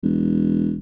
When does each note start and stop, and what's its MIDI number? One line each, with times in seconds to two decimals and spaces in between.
0.03 0.77 28